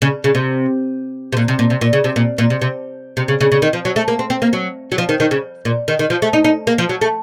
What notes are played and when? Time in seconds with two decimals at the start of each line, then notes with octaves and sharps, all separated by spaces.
0.02 C#3
0.24 C#3
0.35 C3
1.33 C3
1.37 A#2
1.48 C3
1.59 A#2
1.70 C3
1.81 A#2
1.93 C#3
2.04 C3
2.16 A#2
2.38 A#2
2.50 C3
2.62 C3
3.17 C3
3.28 C#3
3.41 C#3
3.52 C#3
3.62 D#3
3.73 F3
3.85 F#3
3.96 A3
4.08 A#3
4.19 C4
4.30 C4
4.42 A#3
4.53 F#3
4.92 F#3
4.98 F3
5.09 D#3
5.20 D#3
5.31 C#3
5.65 A#2
5.88 D#3
5.99 D#3
6.10 F3
6.22 A3
6.33 D#4
6.44 D#4
6.67 A#3
6.78 F3
6.89 F#3
7.01 A3